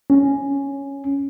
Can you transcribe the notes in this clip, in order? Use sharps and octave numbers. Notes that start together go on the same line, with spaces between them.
C#4